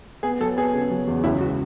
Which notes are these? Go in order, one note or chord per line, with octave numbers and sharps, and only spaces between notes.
B3 G#4
F#3 A4
B3 G#4
C#3
F#3
E2
C#2 E4
F#4